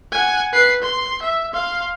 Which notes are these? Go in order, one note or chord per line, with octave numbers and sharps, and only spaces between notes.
F#5 G#5
B4 C7
C6
E5
F5 C6